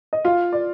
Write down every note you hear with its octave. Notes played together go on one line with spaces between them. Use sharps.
D#5
F4 F5
D5